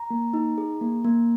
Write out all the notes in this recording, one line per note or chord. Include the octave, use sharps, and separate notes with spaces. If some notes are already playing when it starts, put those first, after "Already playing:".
Already playing: A#5
A#3
D#4
G#4
A#3
A#3